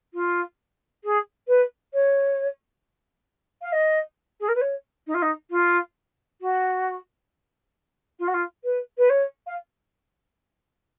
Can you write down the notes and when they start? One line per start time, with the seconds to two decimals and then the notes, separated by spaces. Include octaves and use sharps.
0.13 F4
1.04 G#4
1.47 B4
1.93 C#5
3.61 F5
3.72 D#5
4.40 G#4
4.48 A#4
4.55 B4
4.61 C#5
5.06 D#4
5.14 F4
5.22 D#4
5.50 F4
6.41 F#4
8.19 F4
8.27 F#4
8.33 F4
8.64 B4
8.97 B4
9.09 C#5
9.46 F5